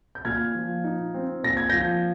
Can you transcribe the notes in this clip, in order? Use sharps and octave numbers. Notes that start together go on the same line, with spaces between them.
G6
A#2 F6 G#6
F3
D#4
C4
A#2 A#6
G#6
F3 G6 A#6